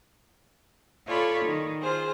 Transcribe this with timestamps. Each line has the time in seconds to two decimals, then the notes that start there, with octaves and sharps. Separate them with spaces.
1.06 F4 A4 C#5 D5 B5
1.46 D#3
1.81 F4 G#4 C5